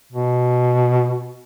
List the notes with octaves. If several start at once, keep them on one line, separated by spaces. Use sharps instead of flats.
B2